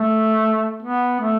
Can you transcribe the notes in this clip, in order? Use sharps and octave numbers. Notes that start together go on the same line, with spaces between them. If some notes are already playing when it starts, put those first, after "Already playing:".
Already playing: A3
B3
A3